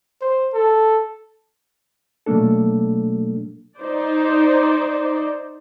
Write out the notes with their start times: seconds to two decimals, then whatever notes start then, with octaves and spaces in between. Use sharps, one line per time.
0.21 C5
0.54 A4
2.26 B2 F#3 A3 A#3 D4 A4
3.79 D#4 C5 D5